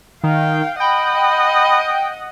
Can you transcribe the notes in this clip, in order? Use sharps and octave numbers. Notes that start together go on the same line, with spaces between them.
D#3 F5 G5
D#5 F#5 G5 B5